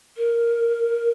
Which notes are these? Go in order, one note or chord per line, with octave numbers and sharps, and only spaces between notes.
A#4